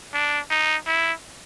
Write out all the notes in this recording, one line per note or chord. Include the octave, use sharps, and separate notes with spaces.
D4
D#4
E4